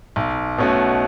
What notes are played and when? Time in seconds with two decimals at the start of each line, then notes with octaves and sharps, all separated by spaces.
0.16 B1
0.58 B2 A3 C#4 F#4